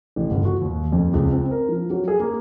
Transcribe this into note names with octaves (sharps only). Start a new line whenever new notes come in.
A1
G1
F#4
D#2
F2
C#2
C4
A#4
F3
F#3
G#4
A#3